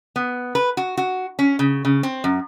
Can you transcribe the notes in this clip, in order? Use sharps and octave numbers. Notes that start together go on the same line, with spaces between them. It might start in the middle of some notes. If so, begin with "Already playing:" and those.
B3
B4
F#4
F#4
C#4
C#3
C#3
C4
F#2